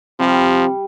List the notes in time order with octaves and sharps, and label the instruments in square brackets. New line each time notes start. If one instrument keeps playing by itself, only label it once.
[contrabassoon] C3 [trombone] F3 [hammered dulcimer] G3